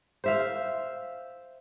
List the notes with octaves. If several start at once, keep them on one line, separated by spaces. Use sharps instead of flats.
C5 E5 F5